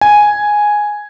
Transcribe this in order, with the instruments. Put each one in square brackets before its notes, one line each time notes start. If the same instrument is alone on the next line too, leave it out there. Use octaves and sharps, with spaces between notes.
[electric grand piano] G#5